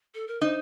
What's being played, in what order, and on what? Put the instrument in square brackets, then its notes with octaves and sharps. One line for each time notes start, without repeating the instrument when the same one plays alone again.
[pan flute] A4
A#4
[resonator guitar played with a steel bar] D#4 [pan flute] C5